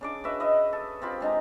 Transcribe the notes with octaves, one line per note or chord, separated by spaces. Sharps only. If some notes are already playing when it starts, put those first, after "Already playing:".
C#3 D4 D6
F#4 B4 E5
B4 D#5 E5
A4
C4 F4 G4 B5
G#3 D4 D#4 A#5